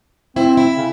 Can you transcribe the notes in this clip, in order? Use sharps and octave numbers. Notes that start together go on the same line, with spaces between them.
C4 E4 C5
E4
C#3